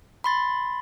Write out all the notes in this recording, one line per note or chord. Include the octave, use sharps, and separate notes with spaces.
B5 C6 A6